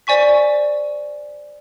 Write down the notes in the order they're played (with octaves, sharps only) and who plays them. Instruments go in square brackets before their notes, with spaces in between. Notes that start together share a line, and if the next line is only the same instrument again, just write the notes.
[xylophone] C5 D5 G#5 C#6 B6